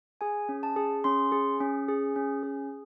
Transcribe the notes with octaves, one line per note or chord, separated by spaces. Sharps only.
G#4 G#5
C#4
A5
G#4
C#4 C6
G#4
C#4
G#4
C#4
G#4